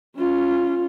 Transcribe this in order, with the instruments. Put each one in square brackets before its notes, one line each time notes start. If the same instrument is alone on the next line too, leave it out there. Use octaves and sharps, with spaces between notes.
[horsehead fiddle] C#4 F4